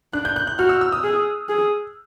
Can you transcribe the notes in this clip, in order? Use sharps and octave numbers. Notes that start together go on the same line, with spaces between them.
D4 F#6
G6
F#6
F#6
F#4 F6
E6
E6
D#6
G#4
G#4